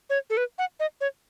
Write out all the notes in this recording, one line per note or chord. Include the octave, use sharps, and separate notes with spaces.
C#5
A4
B4
F#5
D#5
C#5